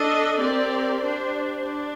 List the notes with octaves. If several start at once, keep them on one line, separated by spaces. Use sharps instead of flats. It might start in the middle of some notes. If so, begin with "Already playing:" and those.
Already playing: D4 A4 D#5
C4 G4 A#4 D5
D4 G4 C5
D4